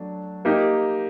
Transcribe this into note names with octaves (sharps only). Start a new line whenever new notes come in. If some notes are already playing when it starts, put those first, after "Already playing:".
Already playing: F#3 A3 D4
A#3 D#4 G4 A#4